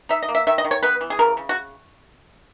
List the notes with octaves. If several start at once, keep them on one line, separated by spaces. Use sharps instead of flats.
D#4 E5
D#5
A#3
E5
D#3 E5
D#5
D#3
C#5
B3 B4
E3
G#4
C#3 A#4
C#3
F#4